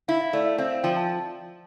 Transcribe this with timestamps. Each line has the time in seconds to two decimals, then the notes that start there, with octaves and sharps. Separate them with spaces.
0.08 E4 F5
0.21 E5
0.33 A3 D5
0.46 E5
0.58 C4 F5
0.71 F5
0.83 F3 G5
0.96 A5